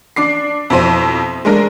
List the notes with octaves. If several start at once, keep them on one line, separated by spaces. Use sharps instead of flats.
D4 D6 C7
F2 B2 E4 C5 D#7
G#3 A3 D4 A#4